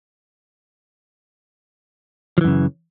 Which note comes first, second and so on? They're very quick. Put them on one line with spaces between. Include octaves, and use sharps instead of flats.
F3 E3 F#2 C#3